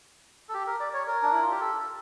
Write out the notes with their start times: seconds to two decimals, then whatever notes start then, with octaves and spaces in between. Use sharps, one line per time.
0.49 A4
0.54 G4
0.67 A#4
0.80 D5
0.93 C#5
1.07 A#4
1.22 D4
1.32 E4
1.41 F4
1.51 G4
1.60 A4